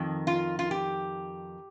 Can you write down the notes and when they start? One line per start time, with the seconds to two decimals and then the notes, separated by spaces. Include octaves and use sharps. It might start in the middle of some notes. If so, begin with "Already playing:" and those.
Already playing: F2 D#3
0.27 F4
0.59 F4
0.71 G4